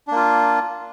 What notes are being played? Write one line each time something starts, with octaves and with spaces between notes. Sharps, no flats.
A#3 D4 F4